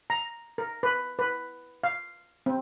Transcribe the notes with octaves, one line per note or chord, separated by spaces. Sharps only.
A#5
A#4
B4
B4
F5
C4